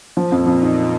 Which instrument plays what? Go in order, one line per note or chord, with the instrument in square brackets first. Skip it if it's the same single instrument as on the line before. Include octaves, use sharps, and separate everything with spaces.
[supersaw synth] A#2 [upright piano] F3
[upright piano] F2
F2
D#4